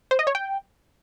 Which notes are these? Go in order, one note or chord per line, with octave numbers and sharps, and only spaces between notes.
C5
D#5
C#5
G5